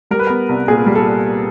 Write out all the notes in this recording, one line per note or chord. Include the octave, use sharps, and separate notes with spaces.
G3 A#4
B4
B3 A#4
C2
A#2 G#4
G3
A4